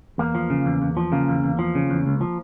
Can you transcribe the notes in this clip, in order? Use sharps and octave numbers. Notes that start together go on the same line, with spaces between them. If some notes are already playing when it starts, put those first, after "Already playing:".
E2 A#3
F3
C#3
E2
E2
F3
C#3 A#3
E2
E2
F3
C#3
E2
C#2
F3